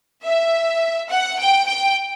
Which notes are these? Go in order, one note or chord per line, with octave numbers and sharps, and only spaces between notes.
E5
F#5
G5
G5